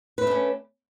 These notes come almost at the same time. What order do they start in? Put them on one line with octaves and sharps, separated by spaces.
B4 A3 D4 C#4